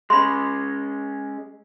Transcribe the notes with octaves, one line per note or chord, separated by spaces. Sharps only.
G#3 C#4 B5 C6